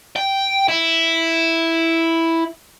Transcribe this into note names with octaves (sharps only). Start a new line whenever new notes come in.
G5
E4